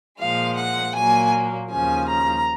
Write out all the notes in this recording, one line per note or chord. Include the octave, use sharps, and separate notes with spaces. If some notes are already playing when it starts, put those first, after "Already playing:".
A#2 F3 G#3 F5
F#5
A#2 F#3 A#3 G#5
D#2 C#3 F3 G#5
A#5